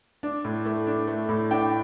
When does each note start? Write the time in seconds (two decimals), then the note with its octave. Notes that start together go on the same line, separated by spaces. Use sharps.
0.23 D4
0.45 A2
0.65 A3
0.87 D4
1.07 A3
1.29 A2
1.51 D4 G5